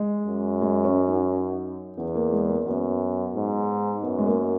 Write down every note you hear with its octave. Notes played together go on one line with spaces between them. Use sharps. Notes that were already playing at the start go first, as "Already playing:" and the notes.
Already playing: G#3
F#2
G#3
C#4
D#4
E2 B3
A#3
G#3
A#3
F#2 B3
G#2
F#2 B3
G#3
A#3